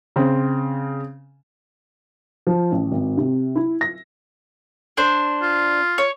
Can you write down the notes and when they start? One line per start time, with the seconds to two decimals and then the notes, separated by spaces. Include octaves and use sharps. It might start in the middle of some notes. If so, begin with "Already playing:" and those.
0.16 C#3 C4
2.47 F3
2.72 A1
2.92 G#1
3.17 C3
3.56 E4
3.81 A#6
4.97 D4 C5
5.42 F4
5.98 C#5